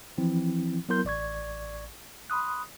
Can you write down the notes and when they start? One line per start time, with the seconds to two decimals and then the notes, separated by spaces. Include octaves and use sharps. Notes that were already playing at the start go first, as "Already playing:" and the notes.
0.18 E3 F3 C4 E4
0.89 F#3 B3 E4 A#4 C6 G6
1.05 A1 D5 C#6 G#6
2.30 B5 C6 D#6 F#6